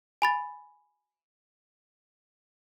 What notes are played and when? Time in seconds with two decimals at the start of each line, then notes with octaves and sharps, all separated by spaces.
0.22 G#5 B5 A6